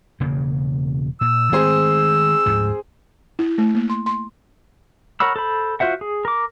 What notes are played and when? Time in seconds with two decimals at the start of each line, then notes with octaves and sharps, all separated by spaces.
0.20 E1 C#3 A#3
1.21 A#2 E6
1.52 D#3 G#3 A3 C4 G#4 C5
2.46 D2 G#2 F3
3.39 E4
3.58 A3
3.75 A#3
3.90 C6
4.06 C6
5.20 A#4 C#5 F#5 B5 E6
5.36 A4 C5 B5
5.80 F4 F#4 C5 E5 F#5
6.01 G#4
6.25 A#4 D6